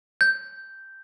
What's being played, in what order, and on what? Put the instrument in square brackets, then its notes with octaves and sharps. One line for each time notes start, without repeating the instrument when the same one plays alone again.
[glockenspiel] G6